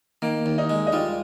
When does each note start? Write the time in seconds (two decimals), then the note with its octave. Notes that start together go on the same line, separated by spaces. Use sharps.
0.22 D#3 A#3
0.46 D#2
0.58 D#4
0.70 G#3
0.87 D#4
0.92 G3 F4